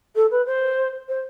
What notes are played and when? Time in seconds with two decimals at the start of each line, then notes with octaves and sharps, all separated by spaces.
0.15 A4
0.31 B4
0.46 C5
1.08 C5